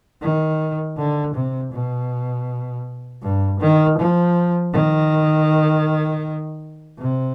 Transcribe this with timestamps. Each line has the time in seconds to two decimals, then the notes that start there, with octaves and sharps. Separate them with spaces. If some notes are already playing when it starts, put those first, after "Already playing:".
0.22 D#3
0.97 D3
1.34 C3
1.72 B2
3.22 G2
3.60 D#3
3.98 F3
4.73 D#3
6.99 C3